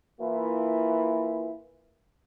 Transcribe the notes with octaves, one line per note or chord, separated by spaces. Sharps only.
E3 A#3 E4 F4